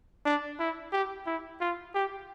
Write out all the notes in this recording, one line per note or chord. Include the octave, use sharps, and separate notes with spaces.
D4
E4
G4
E4
F4
G4